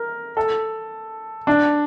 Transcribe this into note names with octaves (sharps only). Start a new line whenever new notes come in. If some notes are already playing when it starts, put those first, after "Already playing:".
Already playing: A#4
A4
D4